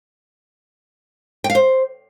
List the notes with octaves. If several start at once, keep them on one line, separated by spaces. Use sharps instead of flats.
G5
F5
C5